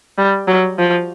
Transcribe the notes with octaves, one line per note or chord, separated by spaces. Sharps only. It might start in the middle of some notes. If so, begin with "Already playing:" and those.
G3
F#3
F3